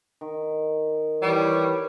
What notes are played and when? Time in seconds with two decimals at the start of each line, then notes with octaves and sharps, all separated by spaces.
0.21 D#3
1.22 E3 G3 B4 C#5